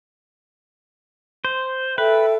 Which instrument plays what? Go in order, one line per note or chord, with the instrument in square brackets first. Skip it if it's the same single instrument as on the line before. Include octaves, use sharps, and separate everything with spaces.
[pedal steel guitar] C5
[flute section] A4 E5 G5 [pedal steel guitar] B4